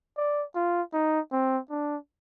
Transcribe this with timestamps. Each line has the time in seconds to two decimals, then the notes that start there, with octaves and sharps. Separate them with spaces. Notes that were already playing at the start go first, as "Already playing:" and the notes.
0.17 D5
0.55 F4
0.93 D#4
1.32 C4
1.70 D4